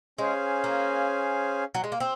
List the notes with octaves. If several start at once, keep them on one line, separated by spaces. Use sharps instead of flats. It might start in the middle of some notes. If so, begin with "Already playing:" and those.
G#3 C#4 G#4 C5 F5 G#5
A#3
F#3
G#3
A#3
C4